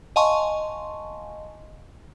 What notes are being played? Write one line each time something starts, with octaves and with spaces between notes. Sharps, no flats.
D#5 F5 G#5 A5 C6 C#6